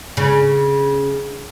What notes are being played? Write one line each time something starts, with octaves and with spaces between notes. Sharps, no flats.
C#3